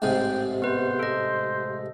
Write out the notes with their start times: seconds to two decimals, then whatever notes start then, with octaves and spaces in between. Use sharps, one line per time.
0.02 A1 G#2 C3 G5
0.62 B3 B4 C5
0.99 A4 D#5